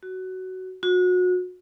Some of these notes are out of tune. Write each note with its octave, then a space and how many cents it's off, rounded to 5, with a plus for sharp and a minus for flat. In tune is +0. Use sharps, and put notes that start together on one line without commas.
F#4 +15
F#4 -30